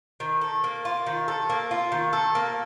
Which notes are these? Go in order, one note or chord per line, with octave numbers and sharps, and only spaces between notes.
D#3
A4
A#3
F4
D#3
A4
A#3
F4
D#3
A4
A#3